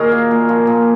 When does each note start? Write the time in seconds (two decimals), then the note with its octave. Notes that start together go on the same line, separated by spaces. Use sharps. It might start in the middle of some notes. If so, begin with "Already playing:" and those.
Already playing: A#2 D#3 F#4 G#4 A#4
0.12 A#3
0.31 A#2
0.49 F3
0.67 A#2